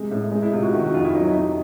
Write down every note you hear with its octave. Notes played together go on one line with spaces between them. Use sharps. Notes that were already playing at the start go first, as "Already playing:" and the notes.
Already playing: C3 G#3
A2
G#3
E4
C3 F4
F#4
D#3
F#4
F2 F4
E4
F#3 D#4
C3